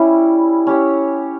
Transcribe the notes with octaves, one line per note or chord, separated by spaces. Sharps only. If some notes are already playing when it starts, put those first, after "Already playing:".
Already playing: G3 C#4 E4
C#4 G4 C#5